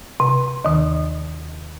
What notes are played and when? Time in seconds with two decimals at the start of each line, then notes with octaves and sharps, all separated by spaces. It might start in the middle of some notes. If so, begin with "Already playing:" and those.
0.20 C3
0.65 D#2 D#3